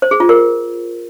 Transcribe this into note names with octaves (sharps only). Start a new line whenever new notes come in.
C5
G#4
F4
A#4